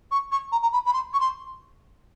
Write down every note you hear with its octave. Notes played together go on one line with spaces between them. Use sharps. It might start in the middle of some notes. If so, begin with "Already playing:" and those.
C#6
C#6
A#5
A#5
B5
B5
C6
C#6
C6